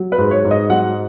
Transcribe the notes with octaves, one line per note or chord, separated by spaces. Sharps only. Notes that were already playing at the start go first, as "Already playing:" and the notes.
Already playing: F#3
B4
G#2
C#5
G#2
D#5
F#3 F#5